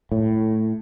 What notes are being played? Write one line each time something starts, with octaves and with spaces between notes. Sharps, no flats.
A2